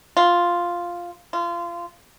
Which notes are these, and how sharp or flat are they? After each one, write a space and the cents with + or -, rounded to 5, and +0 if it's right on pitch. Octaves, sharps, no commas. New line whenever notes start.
F4 +0
F4 -25